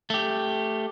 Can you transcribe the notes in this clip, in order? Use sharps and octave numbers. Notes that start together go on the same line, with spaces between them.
A3 G4